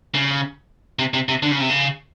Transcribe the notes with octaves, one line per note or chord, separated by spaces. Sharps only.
C#3
C3
C3
C3
D3
C#3
C3
C#3